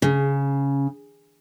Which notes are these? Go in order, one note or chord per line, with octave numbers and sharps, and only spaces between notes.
C#3